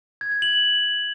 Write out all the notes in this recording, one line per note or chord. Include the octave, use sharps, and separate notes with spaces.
G#6
G#6
F#7